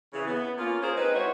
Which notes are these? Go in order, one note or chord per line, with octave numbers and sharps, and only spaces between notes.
C#3 E3
B3
A#3 C#4 F4
C#4 F4 G#4 A#4 C5
G#3 C4 D#4 B4
E4 F#4 C5 C#5